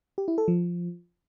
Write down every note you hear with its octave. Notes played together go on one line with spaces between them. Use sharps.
G4
E4
A4
F3